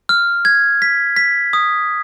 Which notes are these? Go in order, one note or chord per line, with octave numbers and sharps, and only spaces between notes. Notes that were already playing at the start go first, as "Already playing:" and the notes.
F6
G#6
B6
B6
D#6